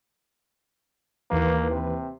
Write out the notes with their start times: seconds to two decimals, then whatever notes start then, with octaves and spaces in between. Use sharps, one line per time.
1.31 D#2 E3 A#3 B4
1.70 C3